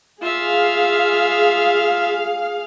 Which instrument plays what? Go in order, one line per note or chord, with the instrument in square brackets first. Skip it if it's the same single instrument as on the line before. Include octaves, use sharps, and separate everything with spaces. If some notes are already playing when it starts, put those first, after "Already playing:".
[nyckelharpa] F4 E5 [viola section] G#4 F5